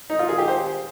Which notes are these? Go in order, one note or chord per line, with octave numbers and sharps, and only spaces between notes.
D#4
F4
G#4
G4
C5